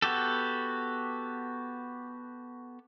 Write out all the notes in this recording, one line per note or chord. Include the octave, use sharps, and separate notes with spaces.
B3 F#4 G4 A4